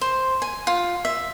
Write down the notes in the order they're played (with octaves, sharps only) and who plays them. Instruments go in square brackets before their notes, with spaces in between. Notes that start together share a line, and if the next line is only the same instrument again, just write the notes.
[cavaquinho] C5
G#5
F4
E5